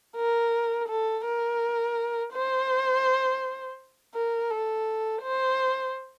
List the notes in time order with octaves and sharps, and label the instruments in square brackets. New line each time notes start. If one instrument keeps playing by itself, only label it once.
[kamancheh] A#4
A4
A#4
C5
A#4
A4
C5